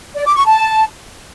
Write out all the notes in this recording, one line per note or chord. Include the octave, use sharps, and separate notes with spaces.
D5
D6
C#6
A5